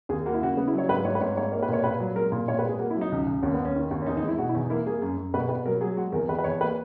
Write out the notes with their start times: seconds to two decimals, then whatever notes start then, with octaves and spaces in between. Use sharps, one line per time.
0.09 D#2 G#4
0.26 A#3 F#4
0.34 E4
0.42 C#3 F#4
0.57 C#3 B3
0.67 E4
0.74 F#3 C#5
0.89 G#2 B4
1.04 G#2 C#5
1.15 B4
1.21 G#2 C#5
1.37 G#2 C#5
1.52 A#3 C#5
1.63 B4
1.68 A#2 C#5
1.84 A#2 B4
2.00 F#3
2.16 G#3 A#4
2.32 A#2
2.48 A#2 C#5
2.59 B4
2.64 G#3
2.69 G#4
2.79 A#3 F#4
2.91 E4
2.96 F#3
3.01 D#4
3.12 C#2
3.27 C#2
3.43 D#2 C#4
3.54 B3
3.59 D#2
3.65 C#4
3.75 D#3
3.91 D#2
4.02 C#4
4.06 E2 D#4
4.17 D#4
4.23 G#3
4.28 E4
4.38 B2 F#4
4.49 E4
4.55 E2
4.60 D#4
4.70 A#3 E4
4.86 A#3 G#4
5.02 F#2
5.17 F#2
5.34 B2 B4
5.49 B2 B4
5.66 F#3 A#4
5.81 F#3 G#4
5.97 G#3 F#4
6.12 E2 A#4
6.28 E2 B4
6.39 B4
6.44 E2 C#5
6.60 A#3 B4